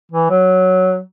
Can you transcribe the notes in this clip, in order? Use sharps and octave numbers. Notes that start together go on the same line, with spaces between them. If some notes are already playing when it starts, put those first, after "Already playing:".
E3
F#3